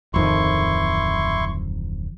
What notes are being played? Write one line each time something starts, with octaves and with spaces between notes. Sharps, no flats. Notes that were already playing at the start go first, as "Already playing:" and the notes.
D1 F2 D#3 E4 C6 C#6